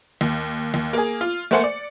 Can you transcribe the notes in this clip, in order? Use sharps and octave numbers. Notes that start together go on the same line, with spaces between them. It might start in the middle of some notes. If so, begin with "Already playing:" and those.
D#2
D#2
A#3 G#4
F4
A3 A#3 C5 F#5 G#5 C#7
D5